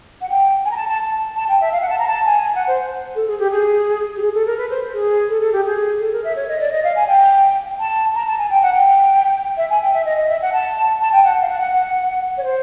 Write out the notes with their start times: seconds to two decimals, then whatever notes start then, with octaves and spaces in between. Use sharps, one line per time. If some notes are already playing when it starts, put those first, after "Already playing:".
0.21 F#5
0.29 G5
0.65 G#5
0.71 A#5
0.77 A5
0.89 A5
1.36 A5
1.49 G5
1.61 E5
1.72 F5
1.82 F#5
1.89 A5
1.99 A#5
2.08 A5
2.25 G#5
2.44 G#5
2.55 F#5
2.67 C5
3.15 A4
3.27 G#4
3.39 G4
3.50 G#4
4.17 G4
4.22 G#4
4.34 A4
4.46 A#4
4.57 B4
4.70 C5
4.94 G#4
5.29 A4
5.41 A4
5.52 G4
5.65 G#4
6.00 A4
6.13 A#4
6.24 E5
6.36 C#5
6.48 D#5
6.60 D5
6.72 D#5
6.84 F5
6.96 G#5
7.07 G5
7.80 A5
8.15 A#5
8.27 A5
8.38 G#5
8.50 G5
8.63 F#5
8.74 G5
9.57 E5
9.70 G#5
9.82 G5
9.94 E5
10.05 D#5
10.17 D#5
10.29 E5
10.42 F#5
10.53 A5
11.01 A5
11.12 G5
11.24 F#5
11.42 F5
11.48 F#5
11.60 F#5
11.72 F#5
12.37 C#5
12.44 C5